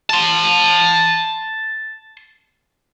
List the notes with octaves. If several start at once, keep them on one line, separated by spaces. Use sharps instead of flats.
A5 C6